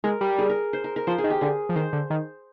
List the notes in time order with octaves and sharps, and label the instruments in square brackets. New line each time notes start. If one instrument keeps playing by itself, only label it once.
[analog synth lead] G#3 [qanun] A#4
[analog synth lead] G3
[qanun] G#4
A#4
C5
A#4
A#4
[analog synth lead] F3 [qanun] C5
[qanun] G#4
[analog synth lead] D#3
[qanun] G4
[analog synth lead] D3 [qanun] G#4
[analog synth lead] F3
[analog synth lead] D#3 [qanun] C5
[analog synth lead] D3
D#3